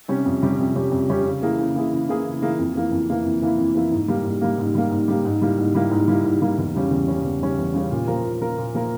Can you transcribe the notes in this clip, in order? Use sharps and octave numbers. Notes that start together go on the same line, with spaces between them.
C3 G3 C#4 G4
F2
C3 G3 C#4 G4
F2
C3 G3 C#4 G4
F2
C3 G3 C#4 G4
C#3
E3 A#3 E4 G#4
C#3
E3 A#3 E4 G#4
C#3
E3 A#3 E4 G#4
C#3
E3 A#3 E4 G#4
F2
E3 A#3 E4
F2
E3 A#3 E4
F2
E3 A#3 E4
F2
E3 A#3 E4
G#2
G3 A#3
G#2
G3 A#3
G#2
G3 A#3
G#2
G3 A#3
G#2
G3 A#3 E4
G#2
G3 A#3 E4
G#2
G3 A#3 E4
G#2
G3 A#3 E4
E2
C#3 G3 C#4
E2
C#3 G3 C#4
E2
C#3 G3 C#4
E2
C#3 G3 C#4
A#2
F3 A#3 F4 A#4
A#2
F3 A#3 F4 A#4
A#2
F3 A#3 F4 A#4